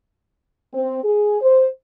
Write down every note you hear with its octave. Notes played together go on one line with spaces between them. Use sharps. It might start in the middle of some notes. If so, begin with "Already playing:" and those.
C4
G#4
C5